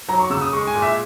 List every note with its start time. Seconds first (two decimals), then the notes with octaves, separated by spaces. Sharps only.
0.08 F#3 A#5
0.20 C#6
0.30 C#3 E6
0.41 D#6
0.53 G#3 C#6
0.67 G#5
0.75 A#2
0.82 E5